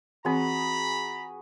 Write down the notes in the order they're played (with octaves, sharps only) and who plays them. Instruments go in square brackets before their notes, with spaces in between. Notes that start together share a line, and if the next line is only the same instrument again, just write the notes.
[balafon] E3 C4 [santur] F#4 G#4 B4 [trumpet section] A#5 B5